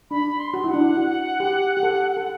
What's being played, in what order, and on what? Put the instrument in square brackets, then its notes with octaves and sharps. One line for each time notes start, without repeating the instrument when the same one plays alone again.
[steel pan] D4 [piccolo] B5
[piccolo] C6
[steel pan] F#4
[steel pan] E4 [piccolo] F#5
[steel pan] D4
E4
F#4
G4
G4
A4
A4